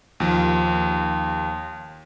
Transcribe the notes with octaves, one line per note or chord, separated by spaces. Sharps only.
D#2 F3